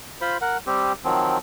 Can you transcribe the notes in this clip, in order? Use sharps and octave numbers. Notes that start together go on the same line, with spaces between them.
F4 C5 B5
A#4 F#5
G3 C4 G4
D#3 F3 F#3 C4